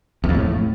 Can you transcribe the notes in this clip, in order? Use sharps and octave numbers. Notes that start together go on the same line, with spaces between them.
E2
F2
A2